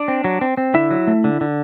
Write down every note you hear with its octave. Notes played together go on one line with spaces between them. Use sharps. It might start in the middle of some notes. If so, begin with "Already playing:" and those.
Already playing: D4 D5
C4
F#3
C4
C4
D3 E4 E5
F#3
A3
D3
D3